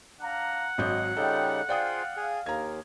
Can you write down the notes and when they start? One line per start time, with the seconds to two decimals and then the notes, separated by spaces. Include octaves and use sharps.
0.21 D4 F5 F#5 A#5
0.78 G#1 F#3 D#5 G6
1.17 C#3 G3 D#4 F4 A4 D#5 G5
1.69 F4 G#4 C5 D5 F5 G5 D#6
2.17 G#4
2.46 D#2 D#3 A#5 G#6